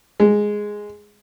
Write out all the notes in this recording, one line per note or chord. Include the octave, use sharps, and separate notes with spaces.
G#3